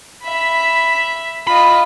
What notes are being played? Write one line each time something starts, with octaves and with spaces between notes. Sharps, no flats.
E5 B5
F4 D#5 B5